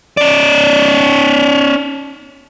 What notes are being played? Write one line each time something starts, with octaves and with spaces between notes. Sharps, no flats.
C#4 D5